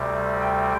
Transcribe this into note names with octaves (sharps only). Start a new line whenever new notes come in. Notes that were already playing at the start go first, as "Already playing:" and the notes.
Already playing: D2 C3 G3
G5